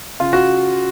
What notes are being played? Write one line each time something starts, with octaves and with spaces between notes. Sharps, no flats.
C#3 F4
F#4